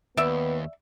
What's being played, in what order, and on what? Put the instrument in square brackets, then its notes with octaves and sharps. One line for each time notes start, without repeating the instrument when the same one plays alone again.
[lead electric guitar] D#2 [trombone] B3 [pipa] D5 E5